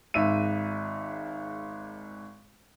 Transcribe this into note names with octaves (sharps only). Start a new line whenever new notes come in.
G#1 G#2 E5 D#7